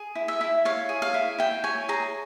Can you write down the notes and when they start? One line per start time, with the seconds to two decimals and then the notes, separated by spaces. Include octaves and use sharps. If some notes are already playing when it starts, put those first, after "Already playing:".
Already playing: G#4
0.15 E4
0.28 E5
0.41 E4
0.65 C#5 F5
0.89 G#4
1.02 F5
1.14 E4
1.38 E4 G5
1.64 C#5 G#5
1.89 G#4 A#5